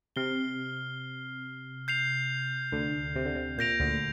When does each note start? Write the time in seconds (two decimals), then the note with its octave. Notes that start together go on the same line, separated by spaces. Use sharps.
0.16 C3 F6 C7 G7
1.88 G6 C7 F7
2.72 D2 D3
3.16 C3
3.25 D3
3.35 C3
3.58 A#2 G6 A#6 D7 F7
3.80 D2 D3